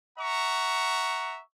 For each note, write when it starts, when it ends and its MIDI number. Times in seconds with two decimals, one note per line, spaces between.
0.19 1.41 76
0.19 1.41 78
0.19 1.41 82
0.19 1.41 85